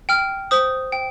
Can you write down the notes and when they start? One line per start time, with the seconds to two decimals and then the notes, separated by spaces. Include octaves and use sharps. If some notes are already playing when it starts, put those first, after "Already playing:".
0.09 G5 F6
0.51 C5 D#6
0.92 G5